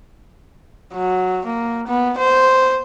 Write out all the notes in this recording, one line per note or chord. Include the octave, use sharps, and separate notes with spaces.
F#3
A#3
B3
C5